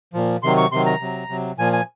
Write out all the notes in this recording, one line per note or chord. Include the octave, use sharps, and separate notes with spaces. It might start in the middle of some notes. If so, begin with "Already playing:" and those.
A#2 F3
C3 D#3 F#3 C6
C#6
C3 D#3 F#3 C6
A#5
C3 F#3
C3 F#3
A#2 F3 G#5
G#5